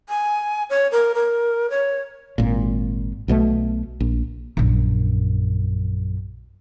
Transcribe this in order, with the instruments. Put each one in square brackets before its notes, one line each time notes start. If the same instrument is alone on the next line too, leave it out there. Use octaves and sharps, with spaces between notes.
[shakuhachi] G#5
C#5
A#4
A#4
C#5
[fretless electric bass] G#1 A#2
B1 B2 G3 A3
A#1
[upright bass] A#1 F#2